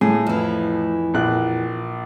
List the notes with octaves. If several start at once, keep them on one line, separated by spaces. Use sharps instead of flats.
A2 G#4
F2 E3
A#1 F#6